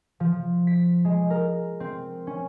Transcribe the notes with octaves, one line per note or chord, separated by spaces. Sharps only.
F3
B6
G#3
A#4
C4
C#4